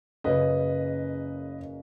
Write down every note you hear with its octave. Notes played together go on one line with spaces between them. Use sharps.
F#1 F#2 C#3 B4 D#5